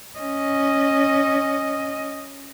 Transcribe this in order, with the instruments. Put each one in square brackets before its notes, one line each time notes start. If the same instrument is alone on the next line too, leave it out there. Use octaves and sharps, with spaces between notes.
[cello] C#4 D#5